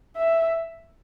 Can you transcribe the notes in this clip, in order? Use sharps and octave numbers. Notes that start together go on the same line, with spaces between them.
E5